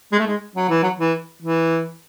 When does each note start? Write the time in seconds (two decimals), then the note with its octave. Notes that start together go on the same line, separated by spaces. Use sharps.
0.12 G#3
0.19 A3
0.27 G#3
0.56 F#3
0.69 E3
0.83 F#3
0.99 E3
1.42 E3